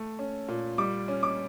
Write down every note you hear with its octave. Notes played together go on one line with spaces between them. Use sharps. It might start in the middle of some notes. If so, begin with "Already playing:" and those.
Already playing: A3
C#4
A#2
G3 D6
C#4
D6